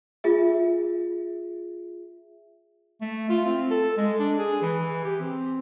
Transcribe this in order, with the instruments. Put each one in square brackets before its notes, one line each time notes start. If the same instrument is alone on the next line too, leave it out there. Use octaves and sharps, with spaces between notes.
[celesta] F4 G#4 E5
[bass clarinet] A3
F4
C4
A4
G#3
D4
G#4
E3
G4
C4